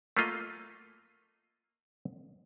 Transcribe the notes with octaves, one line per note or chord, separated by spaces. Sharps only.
A3 A#3 F4 D#5